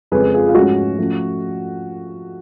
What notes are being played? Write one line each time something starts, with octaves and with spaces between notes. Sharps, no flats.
F2 C#3 G#3 C#4 G#4 B4
F4 G#4
F4
G#2 F3 A3 C#4 F#4
F3 A3 C#4